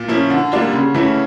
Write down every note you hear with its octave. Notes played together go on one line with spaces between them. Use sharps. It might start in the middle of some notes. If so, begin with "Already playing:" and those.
Already playing: A#2
F3 A#3 C#4 E4
D3
G3 A#3 D4 F4
C#3
E3 A3 C#4 E4